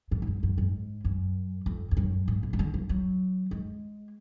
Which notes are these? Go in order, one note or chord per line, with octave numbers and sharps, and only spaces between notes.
G#2
F2
F#2
F#2
G#2
F#2
F2
F2
F#2
G#2
B2
B2
D3
F3
F#3
G#3